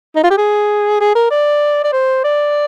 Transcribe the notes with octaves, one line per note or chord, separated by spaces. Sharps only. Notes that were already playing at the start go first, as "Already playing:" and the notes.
D#4
F4
G4
G#4
G#4
A#4
D5
D5
C5
D5